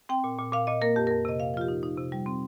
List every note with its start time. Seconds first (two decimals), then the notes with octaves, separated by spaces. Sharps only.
0.09 C4 G5
0.24 A#2
0.39 A#2
0.53 A#2 F5
0.67 A#2 D#5
0.81 A#3 A#4
0.96 F2 G4
1.07 F2 A#4
1.25 C3 D#5
1.39 A#2 F5
1.54 F3 F4
1.61 G4
1.68 D#4
1.83 D#4
1.98 C3
2.12 G3
2.26 C4